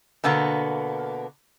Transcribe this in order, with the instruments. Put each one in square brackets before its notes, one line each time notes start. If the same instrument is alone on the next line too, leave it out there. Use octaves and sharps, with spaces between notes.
[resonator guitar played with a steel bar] B2 D3 A#3 B3